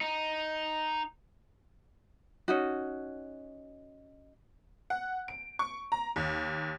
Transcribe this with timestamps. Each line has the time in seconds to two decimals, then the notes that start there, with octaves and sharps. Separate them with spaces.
0.01 D#4
2.48 C#4 D#4 F#4
4.90 F#5
5.28 D7
5.59 C#6
5.92 A#5
6.16 D#2